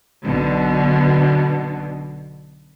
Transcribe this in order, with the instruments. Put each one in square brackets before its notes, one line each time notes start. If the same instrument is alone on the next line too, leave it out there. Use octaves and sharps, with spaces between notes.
[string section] B1 B2 D3